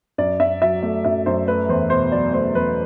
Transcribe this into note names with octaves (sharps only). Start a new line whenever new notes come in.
F#2 D5
F#2 E5
F#3 E5
A3
F#2 E5
F#2 C5
A3 B4
E2 C5
B2 C5
F#3 D5
A3 C5
E2 B4